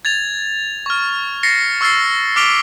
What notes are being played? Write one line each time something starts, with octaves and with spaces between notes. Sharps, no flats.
G#6 A6 F7
C#6 F6
A6 A#6 C7 C#7
C#6 E6 F6 A6 C7
D6 F6 B6 D7 F7 G7